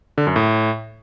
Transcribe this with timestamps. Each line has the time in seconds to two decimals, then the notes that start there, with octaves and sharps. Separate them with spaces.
0.18 D3
0.27 F#2
0.36 A2